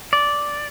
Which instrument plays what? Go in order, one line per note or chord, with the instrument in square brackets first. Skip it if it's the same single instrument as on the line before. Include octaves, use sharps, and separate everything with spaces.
[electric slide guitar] D5